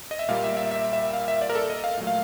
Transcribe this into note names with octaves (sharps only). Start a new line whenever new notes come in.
D#5
E5
A#2 G3 A#3 F5
E5
E5
E5
E5
F5
E5
D5
A#4
A4
D#5
F5
A#2 F#3 A3
F5